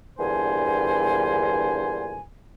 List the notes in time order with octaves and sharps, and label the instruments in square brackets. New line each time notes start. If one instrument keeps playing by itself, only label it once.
[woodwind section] E2 G2 A#2 D3 C5 G#5